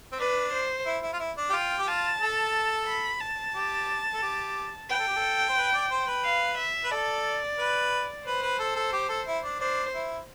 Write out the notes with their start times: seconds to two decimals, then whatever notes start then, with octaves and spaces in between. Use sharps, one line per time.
0.12 C4
0.19 D4 B4
0.53 C5
0.86 E4
1.02 E4
1.13 F4
1.20 E4
1.37 D4
1.49 G4
1.53 F4 G5
1.79 G4
1.87 F4 A5
2.21 A4
2.87 B5
3.21 A5
3.55 G4
4.14 A4
4.22 G4
4.89 B4 G5
4.98 A4
5.08 G4
5.16 A4
5.49 C5
5.57 B4
5.74 D5
5.91 C5
6.07 B4
6.24 F5
6.58 E5
6.84 B4
6.91 A4 D5
7.59 B4
8.26 B4 C5
8.42 B4
8.59 A4
8.76 A4
8.93 G4
9.09 A4
9.27 E4
9.44 D4
9.60 D4 C5
9.94 E4